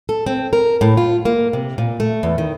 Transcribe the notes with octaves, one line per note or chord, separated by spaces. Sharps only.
A4
C4
A#4
A2
F4
A#3
C3
A#2
A3
E2
D#3